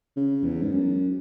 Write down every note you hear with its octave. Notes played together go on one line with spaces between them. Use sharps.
C#3
E2
G#2
F#2